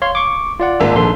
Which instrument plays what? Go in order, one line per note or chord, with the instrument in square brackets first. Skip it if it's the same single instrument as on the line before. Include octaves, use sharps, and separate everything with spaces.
[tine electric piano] C#5 F5 C6
C#6 D6
F4 D5 F#5
[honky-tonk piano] G#1 A#3 E6
[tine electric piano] A#1 A4 C6